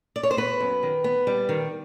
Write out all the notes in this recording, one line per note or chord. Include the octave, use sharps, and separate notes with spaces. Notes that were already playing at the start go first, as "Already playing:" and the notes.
D5
C#5
C5
B3 B4
F#2
D#3
B3
G3
D#3